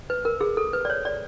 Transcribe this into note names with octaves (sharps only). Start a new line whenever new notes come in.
B4
A#4
G#4
A4
B4
D5
C#5
D5